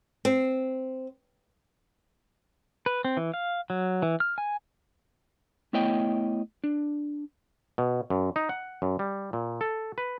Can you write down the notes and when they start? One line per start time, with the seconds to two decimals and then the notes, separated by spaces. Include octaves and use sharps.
0.25 C4
2.86 B4
3.05 C4
3.17 E3
3.34 F5
3.70 F#3
4.02 E3
4.20 F6
4.38 G#5
5.73 A3 B3 E4 C#5 D#5 G5
6.64 D4
7.78 B2
8.10 F#2
8.36 D#4
8.49 F#5
8.82 F#2
8.99 G3
9.33 A#2
9.61 A4
9.98 B4